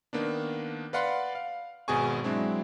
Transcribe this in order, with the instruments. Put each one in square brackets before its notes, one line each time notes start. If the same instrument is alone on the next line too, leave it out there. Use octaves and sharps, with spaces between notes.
[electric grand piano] D#3 A#3 B3 D4
B4 D5 F5 F#5 B5 C6
F5
G#1 B2 F#4 G#4 G#5 C#6
F#3 G#3 C4 D4 E4